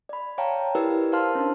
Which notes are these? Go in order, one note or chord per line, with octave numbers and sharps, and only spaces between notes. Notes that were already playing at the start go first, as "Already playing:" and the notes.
D5 B5
C#5 F5 G5 A5 A#5
E4 G4 A#4 B4 D5 E6
A#4 C5 F5 A5 C6 F6
C#4 D4